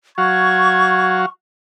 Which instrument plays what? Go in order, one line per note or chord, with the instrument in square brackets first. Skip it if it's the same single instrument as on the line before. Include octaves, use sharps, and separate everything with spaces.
[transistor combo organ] F#3 F#4 F5 [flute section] C#6 [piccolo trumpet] G#6